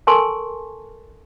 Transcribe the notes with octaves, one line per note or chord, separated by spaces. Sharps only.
A4 A#4 G#5 A5 C6 C#6